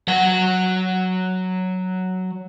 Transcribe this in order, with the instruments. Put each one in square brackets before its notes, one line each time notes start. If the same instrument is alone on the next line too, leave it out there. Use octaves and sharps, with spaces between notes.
[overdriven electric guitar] F#3 F#5